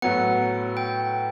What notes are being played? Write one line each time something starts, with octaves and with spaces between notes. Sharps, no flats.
A2 F#3 B3 F#5
G5